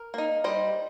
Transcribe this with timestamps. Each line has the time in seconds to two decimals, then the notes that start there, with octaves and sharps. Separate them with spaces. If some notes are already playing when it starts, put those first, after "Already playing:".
Already playing: A#4
0.14 A#3 D#4
0.44 G3 C5 D#5